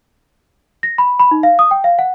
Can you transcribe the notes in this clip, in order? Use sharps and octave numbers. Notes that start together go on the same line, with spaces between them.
A#6
B5
B5
D#4
F5
D#6
G5
F5
F#5